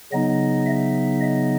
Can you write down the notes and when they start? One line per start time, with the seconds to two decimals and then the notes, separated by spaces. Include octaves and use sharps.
0.12 C#3 F#3 B3 D#4 D#5
0.66 E5
1.21 D#5